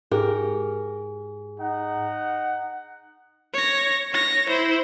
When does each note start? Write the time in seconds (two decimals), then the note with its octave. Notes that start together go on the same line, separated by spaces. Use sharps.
0.12 G#2 G4 G#4 A#4
1.61 D#4 F#5
3.54 C#5 A#6
4.12 C#5 A#6
4.49 E4 C5